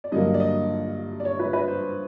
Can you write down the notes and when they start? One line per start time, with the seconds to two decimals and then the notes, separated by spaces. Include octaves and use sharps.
0.04 D5
0.12 G2 D3 F#3 A#3 D#5
0.34 D5
0.40 D#5
1.20 D5
1.25 C#5
1.39 B4
1.53 B4
1.68 C5
1.82 C5